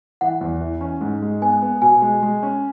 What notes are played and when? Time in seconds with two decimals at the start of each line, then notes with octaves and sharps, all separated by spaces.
0.21 E3 F#5
0.41 E2
0.61 E3
0.81 C#4
1.01 G#2
1.22 G#3
1.42 B3 G#5
1.62 B3
1.82 B2 G#5
2.02 G#3
2.23 G#3
2.43 C#4